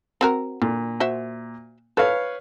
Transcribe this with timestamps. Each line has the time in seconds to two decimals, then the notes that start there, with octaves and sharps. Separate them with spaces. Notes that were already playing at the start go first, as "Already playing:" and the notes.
0.21 C4 F#4 A#4
0.62 A#2 D3
1.00 F#4 C5 E5
1.97 A4 B4 C#5 F5